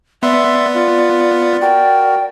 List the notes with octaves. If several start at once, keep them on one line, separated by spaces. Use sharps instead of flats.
B3 D5 E5 C6
F4
F#4 A#4 G5